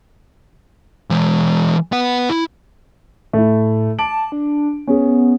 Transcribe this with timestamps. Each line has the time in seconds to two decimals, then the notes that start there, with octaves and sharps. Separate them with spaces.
1.10 E3 G#3
1.92 B3 F#5
2.29 E4
3.33 A2 A3 E4
3.99 A5 D6 D7 F#7
4.32 D4
4.87 B3 C#4 G#4